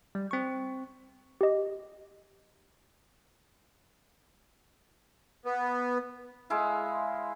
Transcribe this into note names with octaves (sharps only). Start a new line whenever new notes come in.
G3
C4 C#6
G4 D#5
B3
G#3 E4 F5